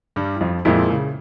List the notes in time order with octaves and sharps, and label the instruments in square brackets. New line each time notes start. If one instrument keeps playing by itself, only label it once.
[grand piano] G2 G3
E3
F2 F3
[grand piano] F2 F3 [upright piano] A#2 G#3 E4
[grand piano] C#3